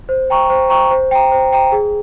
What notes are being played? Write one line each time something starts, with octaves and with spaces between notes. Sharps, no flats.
C5
G5 A#5 C#6
C5
G5 A#5 C#6
C5
G5 A#5
C5
G5 A#5
G#4